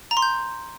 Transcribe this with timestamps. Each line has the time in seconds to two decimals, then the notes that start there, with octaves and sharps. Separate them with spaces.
0.11 A#5
0.17 C6
0.22 G6